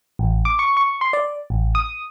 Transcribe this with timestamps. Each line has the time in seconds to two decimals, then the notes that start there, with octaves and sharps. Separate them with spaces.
0.19 A1
0.45 D6
0.59 C#6
0.77 C#6
1.01 C6
1.13 D5
1.50 A1
1.75 D#6